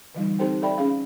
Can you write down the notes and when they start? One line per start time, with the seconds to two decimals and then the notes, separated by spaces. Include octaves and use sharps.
0.15 D3 E3 G3 D#4
0.39 C4 D#4 G4 A4 C5 G5
0.62 A4 D5 E5 G5 B5
0.78 C#4 G#4 F5